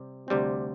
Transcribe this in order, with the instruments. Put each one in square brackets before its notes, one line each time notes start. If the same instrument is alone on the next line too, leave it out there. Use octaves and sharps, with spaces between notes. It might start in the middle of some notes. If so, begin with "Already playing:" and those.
Already playing: [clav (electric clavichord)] C3 G3
D2 C3 G3 C4